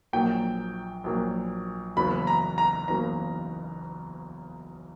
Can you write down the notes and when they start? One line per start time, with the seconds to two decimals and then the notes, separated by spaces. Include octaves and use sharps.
0.13 A#1 A#2 F#3 A#3 G5
1.04 A#1 A#2 F#3 A#3
1.97 F#1 E2 C#3 F#3 A#3 B5
2.27 A#5
2.58 A#5
2.88 F#1 E2 C#3 F#3 A#3 A#5